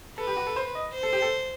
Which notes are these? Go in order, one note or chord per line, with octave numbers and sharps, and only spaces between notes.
A4 B4
G4
F#4
A4
C5
D#5
C5
A4
G4
A4